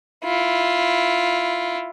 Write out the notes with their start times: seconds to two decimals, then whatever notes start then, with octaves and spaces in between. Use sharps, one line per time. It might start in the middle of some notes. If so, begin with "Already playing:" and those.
0.24 E4 F4